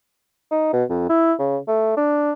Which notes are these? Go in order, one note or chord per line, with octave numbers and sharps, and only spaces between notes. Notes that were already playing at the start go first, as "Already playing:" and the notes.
D#4
B2
F2
E4
C#3
A3
D4